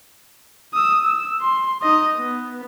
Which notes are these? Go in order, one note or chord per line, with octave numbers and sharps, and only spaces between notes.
D#6 E6
E6
C6
D#4 D#5
B3